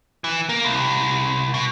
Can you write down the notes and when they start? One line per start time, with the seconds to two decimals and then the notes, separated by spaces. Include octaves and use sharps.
0.24 E3
0.49 A#3
0.64 C2
1.54 B2